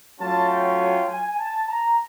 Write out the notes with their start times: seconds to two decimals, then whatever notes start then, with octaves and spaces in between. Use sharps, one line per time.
0.19 F#3 A3 C#4 F4 A5
0.49 G5
0.80 G5
1.10 G#5
1.39 A5
1.69 A#5